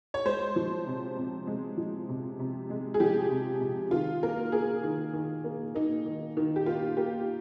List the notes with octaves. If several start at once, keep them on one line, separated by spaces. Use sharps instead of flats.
C#5
G#3 C5
F3
C3
C3
G#3
F3
C3
C3
G#3
G#4
F3 G4
C3
C3
D#3 F4
A#3 A#4
A#3 G#4
D#3
D#3
A#3
A#3 D#4
D#3
D#3
G4
A#3 F4
A#3 G4